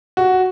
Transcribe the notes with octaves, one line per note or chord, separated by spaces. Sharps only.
F#4